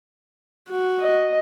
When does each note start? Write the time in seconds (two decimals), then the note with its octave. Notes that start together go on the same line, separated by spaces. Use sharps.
0.69 F#4
1.01 D#5